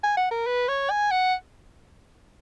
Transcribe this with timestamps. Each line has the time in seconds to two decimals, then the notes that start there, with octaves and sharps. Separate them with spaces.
0.03 G#5
0.17 F#5
0.31 A#4
0.47 B4
0.68 C#5
0.90 G#5
1.11 F#5